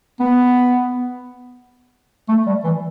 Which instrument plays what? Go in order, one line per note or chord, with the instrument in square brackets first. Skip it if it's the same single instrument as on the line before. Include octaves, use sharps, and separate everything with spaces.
[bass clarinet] B3
A3
G3
E3